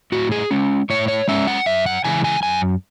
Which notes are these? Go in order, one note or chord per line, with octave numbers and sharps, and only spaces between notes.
A2 F#4
G#4
G#3 C#4
A2 C#5
C#5
G#3 C#4 E5
F#5
F#2 E5
F#5
C#3 E3 G#3 G#5
G#5
F#2 G#5